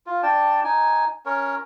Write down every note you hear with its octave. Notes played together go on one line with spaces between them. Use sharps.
F4
D4 D5 G5 A5
D#4 G#5
C#4 A#4 C#5